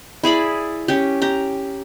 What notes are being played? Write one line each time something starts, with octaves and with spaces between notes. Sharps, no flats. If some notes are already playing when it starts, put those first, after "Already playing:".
E4 G#4 D5 B5
C#4 G4
G4 A#5